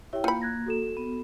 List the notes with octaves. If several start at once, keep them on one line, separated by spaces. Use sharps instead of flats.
E4 G4 C#5 E5 G5
A#3 F4 B5 G6 C#7
F#6 G#6 A#6
F#4 A4 E7
B3